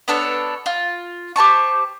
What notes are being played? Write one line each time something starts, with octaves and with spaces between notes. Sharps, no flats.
B3 D4 A4 C#5
F4
G4 C5 A5 C#6